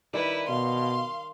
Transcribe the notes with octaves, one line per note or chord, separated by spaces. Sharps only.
D#3 G3 E4 B4
B2 F5 C6